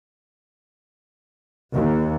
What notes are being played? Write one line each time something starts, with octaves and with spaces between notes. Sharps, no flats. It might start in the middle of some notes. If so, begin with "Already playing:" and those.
D#2